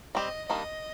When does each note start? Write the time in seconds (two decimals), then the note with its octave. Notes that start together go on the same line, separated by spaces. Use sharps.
0.15 G3 C4 G4 D#5
0.49 D#3 G3 A#3 D4 D#5